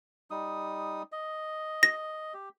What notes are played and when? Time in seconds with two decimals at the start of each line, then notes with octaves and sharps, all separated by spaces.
0.31 G3 D#4 D#6
1.12 D#5
1.83 A#6
2.34 G4